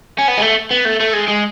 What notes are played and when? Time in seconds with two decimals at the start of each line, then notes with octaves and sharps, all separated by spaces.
0.18 C#4
0.28 B3
0.38 G#3
0.42 A3
0.71 B3
0.85 A3
1.00 A3
1.13 G#3
1.28 G#3